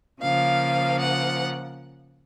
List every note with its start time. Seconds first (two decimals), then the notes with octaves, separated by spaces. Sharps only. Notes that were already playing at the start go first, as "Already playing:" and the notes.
0.21 C#3 F3 A#3 F5
1.00 F#5